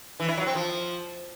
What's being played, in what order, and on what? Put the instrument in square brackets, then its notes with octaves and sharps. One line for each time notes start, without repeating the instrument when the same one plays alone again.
[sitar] E3
E4
F#3
C4
F3